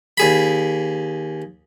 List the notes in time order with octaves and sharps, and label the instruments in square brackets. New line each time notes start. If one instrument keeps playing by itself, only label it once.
[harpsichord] D#2 G#4 B5